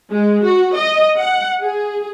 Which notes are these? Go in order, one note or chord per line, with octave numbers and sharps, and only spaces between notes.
G#3
F#4
D#5
F#5
G#4